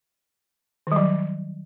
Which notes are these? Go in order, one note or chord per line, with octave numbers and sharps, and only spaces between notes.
D#3 F#3 G3